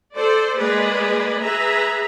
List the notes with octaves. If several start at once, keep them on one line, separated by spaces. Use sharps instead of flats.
A4 C5 D5
G#3 A#3 G#4 B4 D5
G#4 B4 E5 A#5